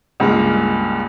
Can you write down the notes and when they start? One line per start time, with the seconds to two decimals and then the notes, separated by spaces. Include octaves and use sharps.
0.20 C#2 G2 G#3 A#3